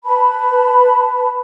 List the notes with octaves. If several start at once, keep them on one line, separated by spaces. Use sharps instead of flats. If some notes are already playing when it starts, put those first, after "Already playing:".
B4 A5 B5